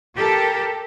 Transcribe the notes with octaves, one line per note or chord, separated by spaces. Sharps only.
G4 A4 A#4